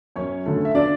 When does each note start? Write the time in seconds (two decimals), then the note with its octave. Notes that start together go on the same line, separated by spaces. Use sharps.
0.16 F#2 C#4 C#5
0.46 D3 A3
0.65 E5
0.75 D4 D5